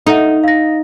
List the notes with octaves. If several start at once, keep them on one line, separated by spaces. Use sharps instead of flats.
D#4 A4 E5 F#5
F5 A#6